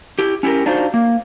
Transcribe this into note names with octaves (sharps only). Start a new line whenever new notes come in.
E4 G4
C#4 E4 F#4 G4 A#4
D4 D#4 F4 F#4 C5
A#3